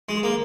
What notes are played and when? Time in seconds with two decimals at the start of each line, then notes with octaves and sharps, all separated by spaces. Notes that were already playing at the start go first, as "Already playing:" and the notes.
0.09 G#3
0.23 A#3